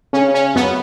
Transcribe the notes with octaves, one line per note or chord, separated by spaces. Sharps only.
C#3 C#4
C#4
F#2 B3